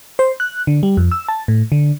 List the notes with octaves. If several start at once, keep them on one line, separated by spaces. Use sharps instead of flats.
C5
F#6
D3
G3
F2
E6
A5
A2
D3